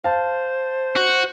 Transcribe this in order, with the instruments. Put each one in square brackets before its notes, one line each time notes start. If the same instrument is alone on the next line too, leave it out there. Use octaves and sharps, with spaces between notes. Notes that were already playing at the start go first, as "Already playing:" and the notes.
[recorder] C5 [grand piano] F5 A5
[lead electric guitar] F#4